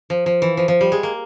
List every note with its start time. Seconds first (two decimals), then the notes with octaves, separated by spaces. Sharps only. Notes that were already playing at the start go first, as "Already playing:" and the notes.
0.10 F3
0.26 F3
0.42 E3
0.57 F3
0.68 F3
0.81 G3
0.92 G#3
1.03 A#3